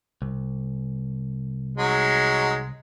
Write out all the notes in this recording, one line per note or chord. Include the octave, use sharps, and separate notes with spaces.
C2
F#3 G#3 D#4